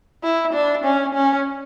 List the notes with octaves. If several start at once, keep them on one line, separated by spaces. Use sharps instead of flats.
E4
D4
C#4
C#4